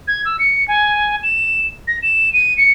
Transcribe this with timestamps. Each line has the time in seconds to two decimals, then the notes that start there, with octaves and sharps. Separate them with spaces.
0.08 G#6
0.25 E6
0.39 C#7
0.68 G#5
1.23 E7
1.88 A#6
2.03 E7
2.33 D#7
2.57 C#7